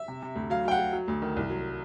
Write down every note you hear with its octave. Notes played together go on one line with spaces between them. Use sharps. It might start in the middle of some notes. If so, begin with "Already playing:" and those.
Already playing: E5
C3
C3
D2
F#3 F5
F#3 G5
F#5
F#3
F#3
D2
D#3
C2
F#3